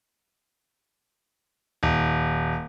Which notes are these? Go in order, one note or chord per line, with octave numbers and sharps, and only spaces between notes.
D#1